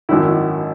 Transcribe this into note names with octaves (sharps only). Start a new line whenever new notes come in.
G#1 F#2 D#3 E4